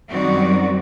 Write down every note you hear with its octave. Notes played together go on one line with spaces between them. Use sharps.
F#2 D#3 G3 C4 F#4 D5